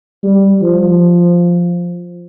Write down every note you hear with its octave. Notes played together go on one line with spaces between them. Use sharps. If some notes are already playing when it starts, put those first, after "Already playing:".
G3
F3